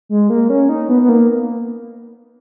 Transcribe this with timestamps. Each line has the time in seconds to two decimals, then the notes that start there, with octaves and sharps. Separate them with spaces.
0.09 G#3
0.30 A#3
0.50 C#4
0.69 D#4
0.89 B3
1.01 B3
1.09 A#3